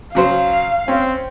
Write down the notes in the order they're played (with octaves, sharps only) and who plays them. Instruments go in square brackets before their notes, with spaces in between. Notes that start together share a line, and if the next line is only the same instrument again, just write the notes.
[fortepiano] C#3 F#3 C5 [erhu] F5
[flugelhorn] C4 [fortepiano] C#4